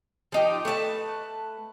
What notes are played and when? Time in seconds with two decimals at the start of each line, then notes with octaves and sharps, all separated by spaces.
0.32 F3 D#4 G4
0.65 A3 B4 E5 A5